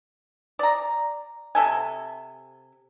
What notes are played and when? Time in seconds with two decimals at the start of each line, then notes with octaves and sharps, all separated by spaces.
0.59 D5 A#5
1.55 C3 A4 G#5